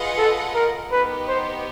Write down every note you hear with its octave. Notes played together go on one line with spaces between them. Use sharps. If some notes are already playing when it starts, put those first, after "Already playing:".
Already playing: F4 G#4 B4 D#5 F#5
A4
A#4
B3 D#4 G4 B4
C5